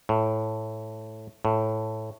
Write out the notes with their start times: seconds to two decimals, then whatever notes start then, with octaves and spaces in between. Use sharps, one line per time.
0.09 A2
1.45 A2